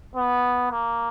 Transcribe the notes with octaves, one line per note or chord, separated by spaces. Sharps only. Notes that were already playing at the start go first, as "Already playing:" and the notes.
B3
A#3